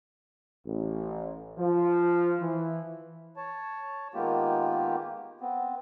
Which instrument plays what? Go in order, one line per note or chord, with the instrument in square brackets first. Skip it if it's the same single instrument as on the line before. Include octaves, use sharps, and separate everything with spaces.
[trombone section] A1
F3
E3
[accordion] C#5 A5
D#3 G#3 A#3 B3 F4 G4
B3 C4